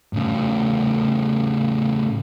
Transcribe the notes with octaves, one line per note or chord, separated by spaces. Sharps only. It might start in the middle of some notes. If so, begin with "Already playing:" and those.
A2 C#3